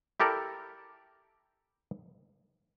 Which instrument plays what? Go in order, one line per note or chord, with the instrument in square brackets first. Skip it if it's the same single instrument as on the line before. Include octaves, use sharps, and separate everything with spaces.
[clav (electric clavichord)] E4 G4 A4 A#4 D5